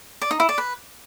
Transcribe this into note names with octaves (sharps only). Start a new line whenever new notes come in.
D5
D#4
E4
D5
B4